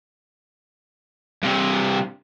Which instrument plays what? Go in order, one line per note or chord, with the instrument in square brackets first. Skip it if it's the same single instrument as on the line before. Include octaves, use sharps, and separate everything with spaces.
[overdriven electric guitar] G2 C3